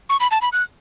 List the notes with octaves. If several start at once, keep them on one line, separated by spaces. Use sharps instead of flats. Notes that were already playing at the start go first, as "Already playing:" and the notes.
C#6
B5
A5
B5
F#6